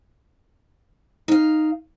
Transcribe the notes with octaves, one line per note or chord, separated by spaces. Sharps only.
D#4 F5